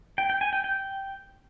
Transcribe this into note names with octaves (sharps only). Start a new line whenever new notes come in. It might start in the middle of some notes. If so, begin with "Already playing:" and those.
G5
G5
G#5
G5
G5